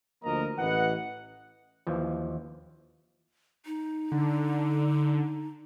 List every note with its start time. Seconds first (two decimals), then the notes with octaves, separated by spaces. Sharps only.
0.24 D2 F3 A#3 A#4 D#5 A#5
0.58 A1 E3 B4 D#5 F#5
1.87 D#2 E3 F3
3.66 D#4
4.12 D3